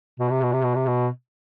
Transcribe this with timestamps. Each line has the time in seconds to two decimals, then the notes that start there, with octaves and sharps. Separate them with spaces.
0.20 B2
0.31 C3
0.42 B2
0.53 C3
0.64 B2
0.75 C3
0.87 B2